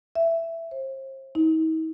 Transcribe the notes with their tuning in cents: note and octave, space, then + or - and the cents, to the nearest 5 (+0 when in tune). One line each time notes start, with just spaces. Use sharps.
E5 +10
C5 +35
D#4 +45